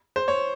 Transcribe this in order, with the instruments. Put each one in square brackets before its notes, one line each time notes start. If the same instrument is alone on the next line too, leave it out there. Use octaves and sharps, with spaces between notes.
[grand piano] C5
C#5